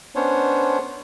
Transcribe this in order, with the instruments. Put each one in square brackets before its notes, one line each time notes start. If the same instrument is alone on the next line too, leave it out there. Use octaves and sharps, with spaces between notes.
[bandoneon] B3 C#4 D4 C5 C#5